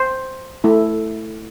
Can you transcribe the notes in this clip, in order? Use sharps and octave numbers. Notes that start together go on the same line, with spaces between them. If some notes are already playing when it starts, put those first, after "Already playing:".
Already playing: C5
A3 E4